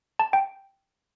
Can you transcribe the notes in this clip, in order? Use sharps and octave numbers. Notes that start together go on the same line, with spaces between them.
A5
G5